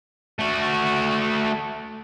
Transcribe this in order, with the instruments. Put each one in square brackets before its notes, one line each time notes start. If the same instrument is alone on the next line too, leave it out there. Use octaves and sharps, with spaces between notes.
[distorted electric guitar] A3 F#4